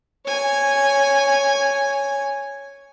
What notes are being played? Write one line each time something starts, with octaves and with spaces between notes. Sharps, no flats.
C#5 G#5